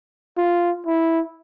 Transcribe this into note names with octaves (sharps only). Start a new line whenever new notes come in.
F4
E4